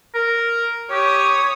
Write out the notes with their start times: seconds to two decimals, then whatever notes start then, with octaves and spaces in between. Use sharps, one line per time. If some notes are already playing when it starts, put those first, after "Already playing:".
0.14 A#4
0.91 G4 C#5 D#6